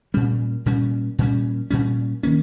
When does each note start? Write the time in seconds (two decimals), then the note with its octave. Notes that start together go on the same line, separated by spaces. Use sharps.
0.14 A#2 G3 C#4
0.66 A#2 G3 C#4
1.18 A#2 G3 C#4
1.70 A#2 G3 C#4
2.23 D#3 A#3 C#4